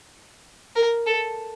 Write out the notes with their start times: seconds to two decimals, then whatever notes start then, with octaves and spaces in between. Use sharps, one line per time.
0.76 A#4
1.06 A4